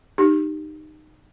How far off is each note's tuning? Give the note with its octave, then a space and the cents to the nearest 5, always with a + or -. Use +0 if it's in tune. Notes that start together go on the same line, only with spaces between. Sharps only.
D#4 -20 G4 +0